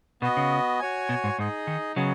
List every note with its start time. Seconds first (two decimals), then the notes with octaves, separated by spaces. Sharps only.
0.22 B2 B3 F#4 D#5
0.37 C#3
0.79 F#4 C#5 G#5
1.09 B2
1.24 G#2
1.39 G#2 D#4 G#4 D#5
1.67 D#3
1.96 C#3 F#3 B3 G#4 D#5 F#5